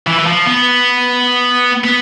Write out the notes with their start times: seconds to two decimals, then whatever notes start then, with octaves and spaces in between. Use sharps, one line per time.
0.07 E3
0.18 E3
0.26 F3
0.46 B3
1.84 B3